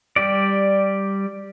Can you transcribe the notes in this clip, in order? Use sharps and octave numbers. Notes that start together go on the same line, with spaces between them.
G3 G4 D5